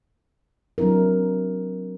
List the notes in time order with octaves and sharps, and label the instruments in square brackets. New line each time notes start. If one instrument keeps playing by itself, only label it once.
[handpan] F#3 C4 D4 E4 A#4